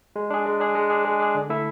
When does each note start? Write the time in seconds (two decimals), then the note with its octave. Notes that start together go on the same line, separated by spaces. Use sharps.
0.16 G#3
0.30 D4 G#4
0.46 G#3
0.60 D4 G#4
0.75 G#3
0.90 D4 G#4
1.05 G#3
1.20 D4 G#4
1.35 D3
1.49 A3 E4 A4 E5